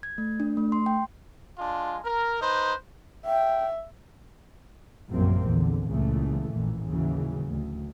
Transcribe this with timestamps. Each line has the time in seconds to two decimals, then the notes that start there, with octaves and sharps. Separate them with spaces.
0.03 G#6
0.18 A3
0.40 D4
0.57 A3
0.72 C6
0.86 G5
1.58 G#3 D4 F4
2.04 A#4
2.41 D#4 B4 C5
3.25 E5 G5
5.10 A#1 F#2 C3 G3 A#3 C4
5.46 E2 A#2 D3
5.90 C#2 A#2 C#3 E3 A3
6.50 A1 F2 A#2 E3
6.88 D#2 C#3 E3 F#3
7.48 D2